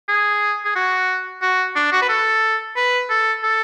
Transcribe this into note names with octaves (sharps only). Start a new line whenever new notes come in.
G#4
G#4
F#4
F#4
D4
F#4
B4
A4
B4
A4
A4